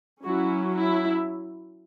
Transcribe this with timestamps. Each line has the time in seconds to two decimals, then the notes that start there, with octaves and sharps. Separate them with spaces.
0.24 F#3 C#4 E4 F#4
0.75 E4